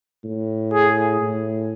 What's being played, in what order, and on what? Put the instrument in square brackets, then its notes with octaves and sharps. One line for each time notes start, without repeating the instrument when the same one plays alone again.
[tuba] A2
[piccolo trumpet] G#4
[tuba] A2